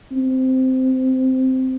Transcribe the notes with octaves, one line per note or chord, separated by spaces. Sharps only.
C4